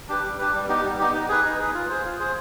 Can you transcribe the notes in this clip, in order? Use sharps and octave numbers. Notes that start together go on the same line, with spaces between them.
D4 G4 B4
G3
D4 G4 B4
G3
B3 D#4 G4
G3
B3 D#4 G4
D#4
G#4 B4
D#4
G#4 B4
F4
G#4 C5
F4
G#4 C5